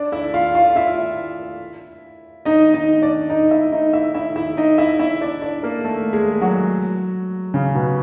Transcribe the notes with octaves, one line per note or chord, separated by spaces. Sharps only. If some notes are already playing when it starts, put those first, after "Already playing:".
Already playing: D4 D5
E4 E5
F4 F5
F4 F5
E4 E5
D#4 D#5
D#4 D#5
D4 D5
D#4 D#5
E4 E5
D#4 D#5
E4 E5
E4 E5
E4 E5
D#4 D#5
E4 E5
E4 E5
D4 D5
D4 D5
A#3 A#4
A3 A4
G#3 G#4
F#3 F#4
C#3 C#4
B2 B3